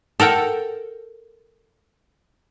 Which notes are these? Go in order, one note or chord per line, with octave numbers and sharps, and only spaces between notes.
A4 A#4 F#5 G5